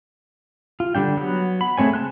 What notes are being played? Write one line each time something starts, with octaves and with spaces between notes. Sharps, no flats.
F4
D3 G3 D4 G5
F#3 B3 F#4
B5
G#3 A3 C4 C#5 G#5
C#3 A5 C6 F#6